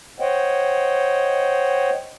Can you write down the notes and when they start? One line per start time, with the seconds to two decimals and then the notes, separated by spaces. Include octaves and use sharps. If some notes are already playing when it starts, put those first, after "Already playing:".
0.20 C5 C#5 D#5 F#5 G5